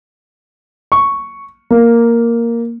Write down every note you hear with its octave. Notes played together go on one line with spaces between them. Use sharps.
C#6
A#3